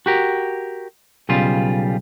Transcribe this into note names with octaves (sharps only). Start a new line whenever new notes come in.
F#4 G4 A#4
B1 C#3 G3 F4